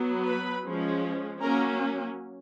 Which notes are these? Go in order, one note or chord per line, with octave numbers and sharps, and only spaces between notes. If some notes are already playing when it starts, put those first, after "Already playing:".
Already playing: F#3 B3
B4 B5
F3 G#3 C#4
F#3 A#3 C#4 A#4 A#5